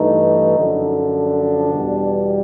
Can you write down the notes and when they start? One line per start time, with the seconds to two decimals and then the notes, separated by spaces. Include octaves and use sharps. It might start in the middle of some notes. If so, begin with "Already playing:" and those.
Already playing: G2 E3 A3 D#4
0.57 F#2 D3 F3
1.14 D4
1.72 E2 B2 G3